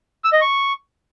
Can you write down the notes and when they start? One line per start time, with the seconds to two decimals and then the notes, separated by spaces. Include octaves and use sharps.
0.24 E6
0.33 D#5
0.41 C#6